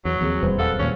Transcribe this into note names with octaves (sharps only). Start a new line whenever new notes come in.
E2 F#3
D#2 F3 C4 G#4
D#1 E2 G3 B4 C5
F#3 A4 F5 F#5
D#2 A#2 C#4